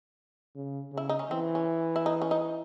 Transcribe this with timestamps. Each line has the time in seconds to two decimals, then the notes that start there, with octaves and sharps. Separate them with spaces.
0.55 C#3
0.92 C#3
0.97 E4
1.09 D#4
1.19 C#4
1.31 E3 C4
1.55 C#4
1.96 E4
2.06 D#4
2.22 C#4
2.31 D#4